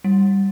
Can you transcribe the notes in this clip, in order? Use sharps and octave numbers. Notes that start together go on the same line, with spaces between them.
G3